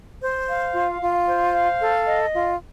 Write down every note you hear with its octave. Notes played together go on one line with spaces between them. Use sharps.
C5
F5
F4
F4
C5
F5
A4
D#5
F4